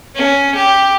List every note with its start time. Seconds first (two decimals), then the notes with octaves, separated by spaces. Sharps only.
0.15 C#4
0.55 G4